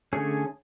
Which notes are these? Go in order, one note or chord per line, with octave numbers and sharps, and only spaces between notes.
D3 A3 C#4 G#4